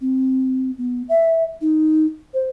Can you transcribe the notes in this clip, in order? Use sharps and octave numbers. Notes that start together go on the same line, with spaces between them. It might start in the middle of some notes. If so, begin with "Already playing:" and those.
C4
B3
E5
D#4
C5